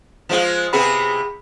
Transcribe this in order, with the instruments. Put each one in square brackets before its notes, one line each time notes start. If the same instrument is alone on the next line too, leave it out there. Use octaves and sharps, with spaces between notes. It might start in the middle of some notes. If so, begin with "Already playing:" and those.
[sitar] F3 G#3 F4 [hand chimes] C5
[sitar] C3 B3 G#4 [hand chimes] B5